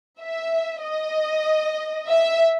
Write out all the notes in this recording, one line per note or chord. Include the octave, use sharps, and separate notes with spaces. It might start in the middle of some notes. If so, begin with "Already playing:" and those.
E5
D#5
E5